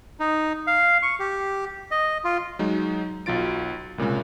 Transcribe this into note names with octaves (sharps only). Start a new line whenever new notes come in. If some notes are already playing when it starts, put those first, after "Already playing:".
D#4
F5
C#6
G4
D#5
F4
F#3 G#3 D#4
B1 F#3 F4 A6 D7
C2 A#2 C#3 G#3